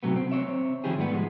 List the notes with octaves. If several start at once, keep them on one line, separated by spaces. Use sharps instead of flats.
C3 E3 F#3 A3 B3
C4
C4 C#5 E5
D#3 F3 E4 G4 G#4
G#2 G3 A3 B3
F3 G#3